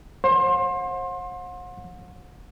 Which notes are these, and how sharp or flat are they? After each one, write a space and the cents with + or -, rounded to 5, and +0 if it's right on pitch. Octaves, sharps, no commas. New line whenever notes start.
C5 +45 F#5 -40 C6 +25